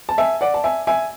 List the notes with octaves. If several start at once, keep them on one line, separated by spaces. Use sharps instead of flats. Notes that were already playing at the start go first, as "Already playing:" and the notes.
A5
E5 G#5
D5 F#5
A5
E5 G#5
E5 G#5